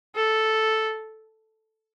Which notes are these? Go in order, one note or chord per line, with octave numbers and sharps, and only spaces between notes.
A4